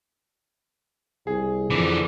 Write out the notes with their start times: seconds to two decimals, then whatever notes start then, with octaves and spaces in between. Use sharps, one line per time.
1.27 C2 G#4
1.70 F2 D3 E3